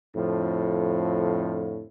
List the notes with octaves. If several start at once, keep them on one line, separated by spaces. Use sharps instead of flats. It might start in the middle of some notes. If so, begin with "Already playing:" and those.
F2 A2 D3 F3